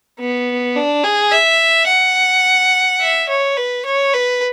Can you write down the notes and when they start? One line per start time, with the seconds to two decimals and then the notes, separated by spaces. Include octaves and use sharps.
0.20 B3
0.76 D4
1.03 G#4
1.31 E5
1.88 F#5
3.01 E5
3.28 C#5
3.57 B4
3.85 C#5
4.14 B4